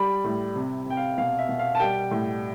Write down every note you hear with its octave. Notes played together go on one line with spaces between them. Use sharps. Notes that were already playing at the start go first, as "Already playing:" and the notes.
Already playing: G3 B5
A2
C3
C3 G5
F5
B2 F5
E5
B2
F5
A5
G3 G5
A2